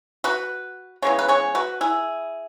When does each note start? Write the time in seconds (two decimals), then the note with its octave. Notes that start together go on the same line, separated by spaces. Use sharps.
0.24 F#4 B4
1.02 C#3 E3 G#3 B3 C#5
1.19 B4
1.28 G#4 C#5
1.55 F#4 B4
1.81 E4 G#4